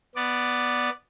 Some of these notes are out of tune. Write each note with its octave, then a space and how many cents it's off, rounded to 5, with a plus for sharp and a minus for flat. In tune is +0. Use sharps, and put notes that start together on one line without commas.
B3 +0 D5 +0